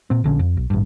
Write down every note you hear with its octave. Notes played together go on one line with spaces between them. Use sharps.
A#2 C4
A#1 D3 C#4
F2
B1
A1 G2